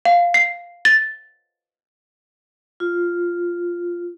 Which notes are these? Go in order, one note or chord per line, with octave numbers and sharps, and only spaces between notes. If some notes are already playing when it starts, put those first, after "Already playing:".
F5
C7
A6
F4